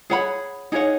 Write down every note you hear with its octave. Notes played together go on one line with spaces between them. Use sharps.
G#4 C#5 F#5 B5
D#4 G#4 C#5 F#5